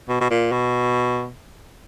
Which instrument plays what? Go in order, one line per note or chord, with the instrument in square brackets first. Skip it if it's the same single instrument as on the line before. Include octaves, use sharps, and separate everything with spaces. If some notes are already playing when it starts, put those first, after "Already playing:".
[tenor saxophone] B2
B2
A#2
B2